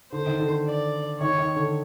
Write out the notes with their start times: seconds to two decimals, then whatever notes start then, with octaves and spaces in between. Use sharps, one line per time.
0.12 D3 C5
0.26 D#3
0.40 D3
0.66 D5
1.20 D#3 C#5
1.39 D#3
1.56 D3